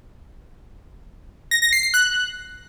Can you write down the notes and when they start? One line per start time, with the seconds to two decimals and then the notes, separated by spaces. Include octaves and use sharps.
1.51 A#6
1.62 A#6
1.73 C7
1.83 C7
1.94 F#6